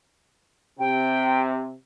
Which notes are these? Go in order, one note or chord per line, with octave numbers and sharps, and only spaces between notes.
C3 G5